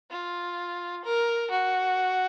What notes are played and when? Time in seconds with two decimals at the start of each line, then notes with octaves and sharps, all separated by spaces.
0.11 F4
1.04 A#4
1.50 F#4